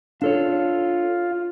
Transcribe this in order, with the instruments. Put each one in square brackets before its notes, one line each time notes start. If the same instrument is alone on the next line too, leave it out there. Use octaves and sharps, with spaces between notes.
[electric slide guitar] D4 A4 C#5 [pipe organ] F4